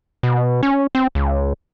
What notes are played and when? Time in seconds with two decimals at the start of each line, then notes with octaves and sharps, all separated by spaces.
0.23 B2
0.63 C#4
0.95 C4
1.15 C#2